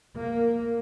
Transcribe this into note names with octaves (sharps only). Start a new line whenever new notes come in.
A#3